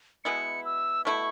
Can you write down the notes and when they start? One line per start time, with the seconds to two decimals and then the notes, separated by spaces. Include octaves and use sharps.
0.24 B2 G#3 B3 E4 C#7
0.65 E6
1.05 B2 A3 E4 C#6